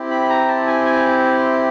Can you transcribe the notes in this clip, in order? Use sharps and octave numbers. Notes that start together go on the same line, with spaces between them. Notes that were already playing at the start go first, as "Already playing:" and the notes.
Already playing: C4 E4 G4
B5
A#5
A5
G#5
G#5